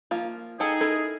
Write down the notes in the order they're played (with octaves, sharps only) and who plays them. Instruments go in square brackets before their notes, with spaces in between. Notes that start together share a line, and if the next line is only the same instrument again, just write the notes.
[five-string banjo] F3 A#3 F4
[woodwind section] D#4 G#4 [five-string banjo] A4 G5
[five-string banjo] E4 A4 A#4